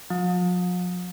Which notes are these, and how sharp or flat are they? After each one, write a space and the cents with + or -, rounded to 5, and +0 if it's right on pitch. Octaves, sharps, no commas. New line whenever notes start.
F3 +45